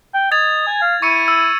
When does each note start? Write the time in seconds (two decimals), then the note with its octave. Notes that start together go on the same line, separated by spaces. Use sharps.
0.14 G5
0.32 D#5 G#6 A6 F7
0.67 G#5
0.82 F5
1.02 E4 C#6 C#7 D#7
1.28 E6